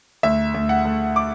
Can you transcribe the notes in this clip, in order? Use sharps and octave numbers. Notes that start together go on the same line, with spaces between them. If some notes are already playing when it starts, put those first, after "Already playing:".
D2 E5
D2
F#5
A3
D6